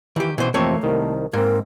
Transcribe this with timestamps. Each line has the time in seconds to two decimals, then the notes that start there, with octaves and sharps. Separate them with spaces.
0.16 D#3 E3 G4
0.38 B2 E3 C5
0.54 F2 C3 E3 A3 A#3 C4 C#5
0.83 C2 D#3 A#4
1.33 G#2 A#3 C4 A#4